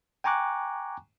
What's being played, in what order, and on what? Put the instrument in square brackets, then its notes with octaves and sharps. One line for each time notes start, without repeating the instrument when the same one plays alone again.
[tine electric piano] G5 G#5 A#5 C#6 D6 F#6